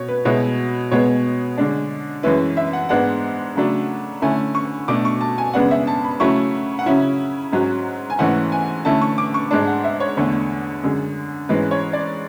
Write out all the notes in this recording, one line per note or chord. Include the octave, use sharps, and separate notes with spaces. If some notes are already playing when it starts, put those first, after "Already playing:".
Already playing: B2 C#5
B4
B2 G#3 B3 E4 C#5
B2 G#3 B3 C#5
D3 G#3 D4
F#2 E3 G#3 C#4 E4 B4
E5
F#5
G#2 G#3 B3 D4 F#5
C#3 F#3 A3 D4
D3 A3 C#4 E4 G#5
C#6
B2 A3 D4 D6
C#6
A5
G#5
F#2 C#3 G#3 B3 D4 F#5
E5
A5
B5
C#3 F#3 A3 C#4 E4 C#6
F#5
C#3 F#3 C#4 E4 E5
G#2 F#3 C#4
G#5
G#2 E3 A3 C#4 F#5
G#5
D3 A3 C#4 E4 A5
C#6
D6
C#6
G#2 G#3 D4 A5
F#5
E5
C#5
E2 D3 A3 D4 C#5
F#2 D3 G#3
G#2 E3 G#3 C#4 B4
C#5
D5